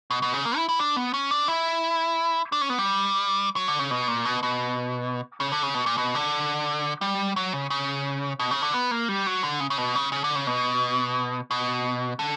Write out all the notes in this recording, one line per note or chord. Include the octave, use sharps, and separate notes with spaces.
B2
B2
C#3
A#3
E4
E4
D4
B3
C#4
D4
E4
D4
C#4
B3
G3
F#3
D3
C#3
B2
A#2
B2
B2
C#3
D3
C#3
B2
A#2
B2
D3
G3
F#3
C#3
C#3
B2
C#3
D3
B3
A#3
G3
F#3
D3
C#3
C#3
B2
C#3
C#3
D3
C#3
B2
B2
D3